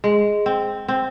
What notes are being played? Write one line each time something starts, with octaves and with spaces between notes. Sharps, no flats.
G#3
C4
C4